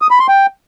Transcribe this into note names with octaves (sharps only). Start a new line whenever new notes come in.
D#6
B5
C6
G5